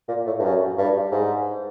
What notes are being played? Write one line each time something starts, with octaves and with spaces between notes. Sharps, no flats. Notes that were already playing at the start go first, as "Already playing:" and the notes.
A#2
A2
G2
F#2
G2
G#2